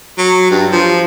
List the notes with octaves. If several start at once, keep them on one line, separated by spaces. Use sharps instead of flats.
F#3
G2
F3